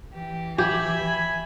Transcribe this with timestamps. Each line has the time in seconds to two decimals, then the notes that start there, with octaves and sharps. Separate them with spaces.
0.13 E3 G4
0.58 G4 E5 G#5 B5